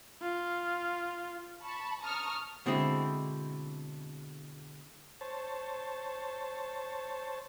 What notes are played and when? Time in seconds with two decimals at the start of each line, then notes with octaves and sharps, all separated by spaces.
0.22 F4
1.62 A5 B5 C#6
2.02 A5 A#5 C#6 D#6 F6
2.66 B2 D3 G#3 C4 E4
5.21 C5 C#5 A5